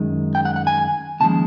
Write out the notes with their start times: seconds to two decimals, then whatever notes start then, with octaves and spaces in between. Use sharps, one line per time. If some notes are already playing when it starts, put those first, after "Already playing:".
Already playing: F#2 D#3 G#3
0.35 G5
0.45 F#5
0.56 F#5
0.67 G#5
1.20 D#2 C#3 F3 G#3 A5